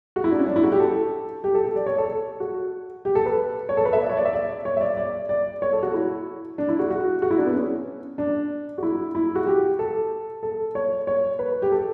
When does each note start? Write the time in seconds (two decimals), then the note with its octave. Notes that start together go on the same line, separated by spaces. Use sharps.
0.16 F#4
0.24 E4
0.31 D4
0.39 C#4
0.47 D4
0.56 E4
0.63 F#4
0.72 G4
0.80 A4
1.44 G4
1.55 A4
1.65 G4
1.76 D5
1.86 C#5
1.98 A4
2.40 F#4
3.05 G4
3.15 A4
3.26 B4
3.69 C#5
3.77 A4
3.85 B4
3.93 E5
4.01 D5
4.09 C#5
4.17 D5
4.25 E5
4.33 D5
4.65 C#5
4.77 E5
4.81 D5
4.97 D5
5.29 D5
5.62 C#5
5.73 A4
5.83 F#4
5.94 E4
6.58 D4
6.69 E4
6.79 F#4
6.90 F#4
7.22 F#4
7.31 E4
7.38 D4
7.46 B3
7.55 C#4
8.18 D4
8.78 F#4
8.83 E4
9.15 E4
9.35 F#4
9.47 G4
9.79 A4
10.43 A4
10.75 C#5
11.07 C#5
11.39 B4
11.62 G4
11.71 A4